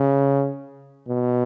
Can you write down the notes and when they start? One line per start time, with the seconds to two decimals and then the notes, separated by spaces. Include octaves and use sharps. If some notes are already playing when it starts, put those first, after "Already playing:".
Already playing: C#3
1.08 B2